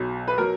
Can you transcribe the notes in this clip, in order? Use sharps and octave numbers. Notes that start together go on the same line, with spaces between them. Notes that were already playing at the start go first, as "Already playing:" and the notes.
Already playing: B1 B2 F#3
B4
B2 F#3 A#4